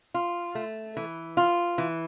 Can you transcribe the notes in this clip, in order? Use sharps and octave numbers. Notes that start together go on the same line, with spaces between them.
F4
A3
E3
F4
E3